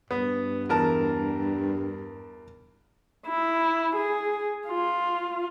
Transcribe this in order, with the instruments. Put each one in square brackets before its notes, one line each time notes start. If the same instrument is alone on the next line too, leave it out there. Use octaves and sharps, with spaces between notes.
[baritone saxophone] G2 [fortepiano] B3
[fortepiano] E2 A#4 A5
[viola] E4
G#4
F4